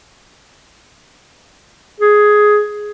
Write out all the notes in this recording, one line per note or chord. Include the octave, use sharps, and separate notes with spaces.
G#4